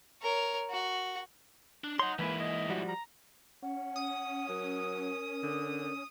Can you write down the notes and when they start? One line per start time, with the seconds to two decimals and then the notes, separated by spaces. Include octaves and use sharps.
0.22 A#4 C#5
0.70 F#4
1.84 D4
1.99 D#4 C#5 F#5 C6
2.19 G#2 E3 G#3 A#3 E4 B4
2.40 D#5
2.69 F3 G3 F#4
2.88 A#5
3.63 C#4 F#5
3.96 D#6
4.49 F#3 A#4
5.43 D3